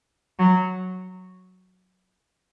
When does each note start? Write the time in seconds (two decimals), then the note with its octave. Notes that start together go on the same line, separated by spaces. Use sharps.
0.39 F#3